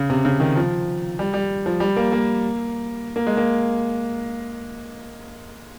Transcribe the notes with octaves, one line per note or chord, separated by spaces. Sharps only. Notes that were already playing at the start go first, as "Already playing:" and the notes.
Already playing: C#3
C3
C#3
D#3
F3
G3
G3
F3
G3
A#3
A#3
A#3
G#3
A#3